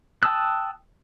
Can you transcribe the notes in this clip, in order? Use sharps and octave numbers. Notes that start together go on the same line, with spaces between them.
G5 A5 D#6 E6 F#6